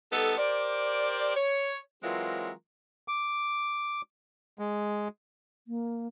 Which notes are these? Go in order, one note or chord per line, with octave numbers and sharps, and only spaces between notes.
G3 B3 D#4 A4
G4 A#4 C5 D5
C#5
E3 F#3 G#3 C4 F4 A#4
D6
G#3
A#3